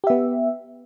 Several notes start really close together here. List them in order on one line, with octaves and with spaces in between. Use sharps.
G4 E5 B3